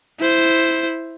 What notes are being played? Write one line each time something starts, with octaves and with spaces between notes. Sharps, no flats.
E4 C5